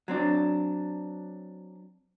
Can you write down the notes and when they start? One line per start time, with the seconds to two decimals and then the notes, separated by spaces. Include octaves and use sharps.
0.08 F#3 C4 D4